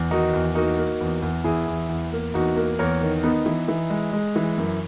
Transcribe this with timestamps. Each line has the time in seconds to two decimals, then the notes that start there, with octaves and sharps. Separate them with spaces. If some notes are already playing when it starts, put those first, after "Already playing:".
Already playing: E2
0.11 D#3 D#4 F#4
0.33 E2
0.55 A#3 D#4 F#4
0.78 A#3
1.00 E2
1.22 E2
1.44 E2 E4 G#4
1.67 E2
1.89 E2
2.13 A#3
2.34 E2 D#4 F#4
2.57 A#3
2.79 E2 A#4 C#5
3.01 D#3
3.23 B3 D#4
3.46 E3
3.68 E3
3.90 G#3
4.13 G#3
4.36 E3
4.58 F#2